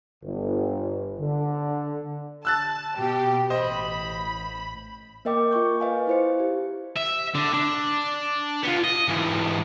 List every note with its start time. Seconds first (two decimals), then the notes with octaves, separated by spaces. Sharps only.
0.24 G1
1.20 D3
2.45 A5 E6 F#6 A6
2.96 B2 G4
3.50 A1 C5 D#5 B5
5.25 A#3 A#4 D#5 G5 D6
5.51 F4 G5 C#6 G6
5.80 B4 D#5 F5 G#5
6.07 E4 C5 C#7
6.40 G4
6.96 E5
7.34 D3
7.54 D4
8.63 B3 F4
8.84 D#5
9.08 G#2 E3